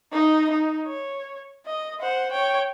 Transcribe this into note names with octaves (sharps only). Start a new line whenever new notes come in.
D#4 D#5
D#4
C#5
D#5
C5 F#5
C#5 G5